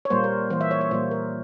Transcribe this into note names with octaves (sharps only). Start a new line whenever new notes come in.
C#5
A#2 G3 A#3 C5
A#4
E3 A#3 C5
E5
C#5
C#5
A#2 G3 A#3 C5
A#4